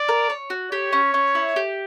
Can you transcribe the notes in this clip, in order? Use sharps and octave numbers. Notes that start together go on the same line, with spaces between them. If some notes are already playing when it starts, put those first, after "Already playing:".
Already playing: D5
A#4
C#5
F#4
G4 C#5
C#4
C#4
E4
G4